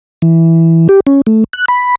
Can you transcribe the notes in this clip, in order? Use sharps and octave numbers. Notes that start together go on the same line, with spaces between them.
E3
G4
C#4
A3
F#6
B5